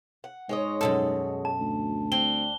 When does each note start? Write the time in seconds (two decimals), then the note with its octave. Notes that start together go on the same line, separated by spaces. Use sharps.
0.24 F#5
0.49 G#2 G#3 C#5 D#5
0.81 F#2 B2 A4
1.45 A5
1.60 D2
2.12 C4 D4 G7